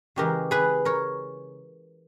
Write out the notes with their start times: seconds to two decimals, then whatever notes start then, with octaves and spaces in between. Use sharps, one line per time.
0.16 C#3 E3 G#3 G4 A#4
0.51 G#4 B4
0.85 A#4 C#5